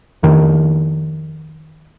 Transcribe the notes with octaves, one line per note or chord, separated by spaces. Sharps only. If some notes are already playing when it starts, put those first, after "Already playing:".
F2 D#3